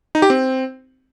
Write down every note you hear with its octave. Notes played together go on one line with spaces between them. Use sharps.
D#4
G4
C4